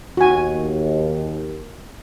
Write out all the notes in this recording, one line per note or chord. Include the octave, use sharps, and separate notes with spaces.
D#2 F#4 G#5